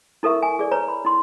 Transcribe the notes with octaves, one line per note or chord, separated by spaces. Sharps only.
E4 A4 A#4 E5 C#6
G#5
G#4 D5
B4 C#5 A#5
B5
E4 C6